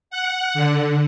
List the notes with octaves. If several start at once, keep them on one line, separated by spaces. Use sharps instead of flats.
F#5
D3